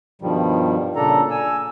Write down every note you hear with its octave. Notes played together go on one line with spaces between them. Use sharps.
G2 B2 D#3 F3 G3
A#2 C#3 D4 A4 A#5
G#5 E6